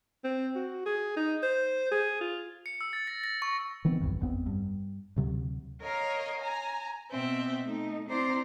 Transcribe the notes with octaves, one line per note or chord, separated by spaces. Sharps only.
C4
F#4
G#4
D#4
C5
G#4
F4
C#7
E6
A6
A#6
A#6
C#6
D#3 E3 B3 C4
B1 E2 G2
G#1 F2 B3 C4
G2
D2 C3 F#3
A#4 C#5 D#5 F5
G#5 A#5
B2 C4 E5
A3 D#4
C4 E4 C5 D5 A#5 C6